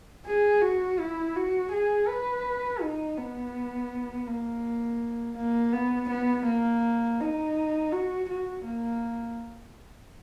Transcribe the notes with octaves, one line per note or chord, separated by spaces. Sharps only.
G#4
F#4
E4
F#4
G#4
B4
D#4
B3
A#3
A#3
B3
B3
A#3
D#4
F#4
F#4
A#3